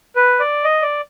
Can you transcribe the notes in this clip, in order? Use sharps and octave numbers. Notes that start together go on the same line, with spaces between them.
B4
D5
D#5
D5